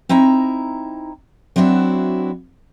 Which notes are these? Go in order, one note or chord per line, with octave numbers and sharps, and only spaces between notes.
C4 D#4 E4 A#5
F#3 C4 D4 E4 F#4